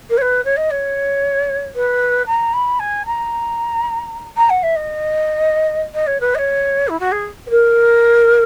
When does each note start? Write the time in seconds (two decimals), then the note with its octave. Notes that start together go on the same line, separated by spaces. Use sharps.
0.10 A#4
0.18 C#5
0.22 B4
0.45 C#5
0.57 D#5
0.71 C#5
1.76 B4
2.27 A#5
2.54 B5
2.79 G#5
3.06 A#5
4.37 A#5
4.50 F#5
4.63 E5
4.76 D#5
5.94 D#5
6.07 C#5
6.20 B4
6.35 D#5
6.38 C#5
6.88 E4
7.00 F#4
7.12 G#4
7.47 B4
7.50 A#4